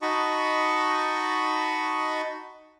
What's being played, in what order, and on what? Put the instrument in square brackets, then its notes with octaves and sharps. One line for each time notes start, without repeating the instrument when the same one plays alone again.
[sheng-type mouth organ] D#4 F#4 D#5 A5 B5 C#6